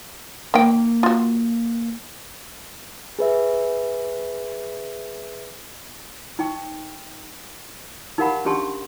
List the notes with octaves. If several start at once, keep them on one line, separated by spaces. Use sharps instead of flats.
D#3 A#3 G5
F4 F#4
G#4 B4 E5
D#4 G5 C#6
D#4 G4 A#4 F5 F#5 B5
C#4 D4 G4 A5 C6 C#6